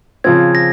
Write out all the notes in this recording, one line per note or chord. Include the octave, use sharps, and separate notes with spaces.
C#3 F3 C4 G#6
A#6